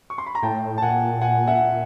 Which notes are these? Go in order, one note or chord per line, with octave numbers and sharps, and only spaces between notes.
C#6
C6
B5
A#5
A2 G5 A5
A5
A#2 F#5 G#5
F#5 G#5
E5 F#5